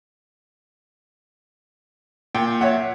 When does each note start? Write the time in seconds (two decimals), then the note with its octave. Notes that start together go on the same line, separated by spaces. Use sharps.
2.35 A#2 G5
2.61 C#5 E5 F#5